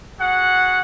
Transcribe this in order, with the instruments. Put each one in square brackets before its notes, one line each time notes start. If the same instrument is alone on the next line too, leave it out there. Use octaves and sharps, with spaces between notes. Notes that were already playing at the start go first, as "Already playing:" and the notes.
[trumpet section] F#4 G#4 F#5